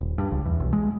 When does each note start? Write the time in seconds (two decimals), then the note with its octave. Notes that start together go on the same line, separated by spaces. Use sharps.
0.01 D#1
0.18 G2
0.31 C#2
0.46 E2
0.60 B1
0.73 G#3